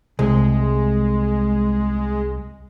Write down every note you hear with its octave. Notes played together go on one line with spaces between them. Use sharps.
C2 G#3